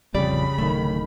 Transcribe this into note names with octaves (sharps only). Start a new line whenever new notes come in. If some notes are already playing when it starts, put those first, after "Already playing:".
A1 F2 C#3 G3 D5 B5
D1 D#3 A3